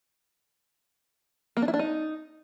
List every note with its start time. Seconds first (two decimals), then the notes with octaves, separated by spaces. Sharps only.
1.57 A#3
1.62 D4
1.68 E4
1.74 D4
1.79 D#4